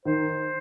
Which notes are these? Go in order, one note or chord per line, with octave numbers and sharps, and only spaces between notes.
D#3 C5